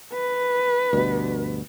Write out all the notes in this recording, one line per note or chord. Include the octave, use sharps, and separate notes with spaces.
B4
D2 G2 B2